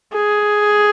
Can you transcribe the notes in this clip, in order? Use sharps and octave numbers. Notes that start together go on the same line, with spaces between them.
G#4